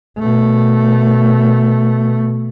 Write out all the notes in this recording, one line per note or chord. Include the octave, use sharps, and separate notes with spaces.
B2 A3